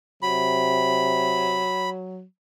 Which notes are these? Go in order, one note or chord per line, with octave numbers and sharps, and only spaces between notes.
C3 F#3 B5